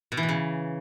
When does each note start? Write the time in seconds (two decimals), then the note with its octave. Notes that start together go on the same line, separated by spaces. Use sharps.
0.12 B2
0.17 E3
0.23 B2
0.29 C#3